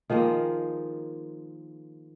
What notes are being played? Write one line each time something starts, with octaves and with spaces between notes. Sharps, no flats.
D#3 F3 G#3 A#3